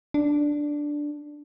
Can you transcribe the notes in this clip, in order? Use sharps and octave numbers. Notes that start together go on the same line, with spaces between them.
D4